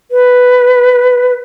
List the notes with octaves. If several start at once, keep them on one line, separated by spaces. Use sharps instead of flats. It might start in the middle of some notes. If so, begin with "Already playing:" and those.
B4